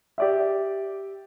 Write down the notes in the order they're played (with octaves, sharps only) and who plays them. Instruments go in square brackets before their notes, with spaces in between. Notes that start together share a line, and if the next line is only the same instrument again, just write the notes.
[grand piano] G4 D5 E5